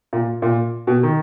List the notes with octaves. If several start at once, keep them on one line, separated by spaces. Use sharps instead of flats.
A#2
A#2
B2
D#3